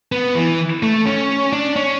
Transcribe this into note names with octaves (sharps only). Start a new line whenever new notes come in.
B3
E3
A3
C#4
D4
C#4